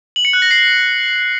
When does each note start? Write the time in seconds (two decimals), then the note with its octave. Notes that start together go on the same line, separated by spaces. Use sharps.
0.16 F#7
0.25 C#7
0.33 F#6
0.42 A#6
0.51 C7